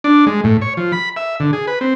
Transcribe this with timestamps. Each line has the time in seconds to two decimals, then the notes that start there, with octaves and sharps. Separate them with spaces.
0.04 D4
0.27 G#3
0.44 A2
0.62 C#5
0.77 F3
0.92 B5
1.16 E5
1.40 D3
1.53 G#4
1.67 B4
1.81 C4